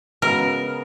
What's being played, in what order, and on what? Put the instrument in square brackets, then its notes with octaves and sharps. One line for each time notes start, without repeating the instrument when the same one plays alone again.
[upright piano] C#3 G#3 B3 F#4 [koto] A#4